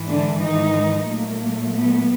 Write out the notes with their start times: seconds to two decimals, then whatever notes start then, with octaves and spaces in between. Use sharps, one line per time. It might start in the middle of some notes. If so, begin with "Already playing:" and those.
Already playing: G#2 E3 G#3
0.08 D3 D4
0.41 D#3 D#4
1.06 A#2 F#3 A3 A#3
1.72 B3